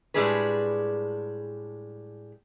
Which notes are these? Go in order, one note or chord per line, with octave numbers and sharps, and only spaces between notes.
A2 G3 G#3 D4 G#4 B4